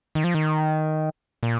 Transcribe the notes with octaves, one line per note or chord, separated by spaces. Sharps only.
D#3
F3
D#3
A#2